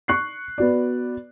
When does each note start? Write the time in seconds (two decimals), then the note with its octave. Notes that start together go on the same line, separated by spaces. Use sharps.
0.08 C#6 F#6 C7
0.58 B3 F#4 D5